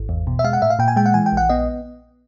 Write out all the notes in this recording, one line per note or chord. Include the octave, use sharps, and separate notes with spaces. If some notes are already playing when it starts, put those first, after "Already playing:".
Already playing: G#1
E2
B2
E5
G#3 F5
F#5
A2 E5
F5
A#2 G5
G#5
G#3 G5
F#5
E3 G#5
G5
A#1 F#5
B3 D#5